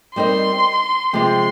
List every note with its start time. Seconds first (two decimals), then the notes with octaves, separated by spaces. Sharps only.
0.16 G3 C4 D#4 A#4 D#5 C6
1.13 C3 F3 G#3 C4 G4 C6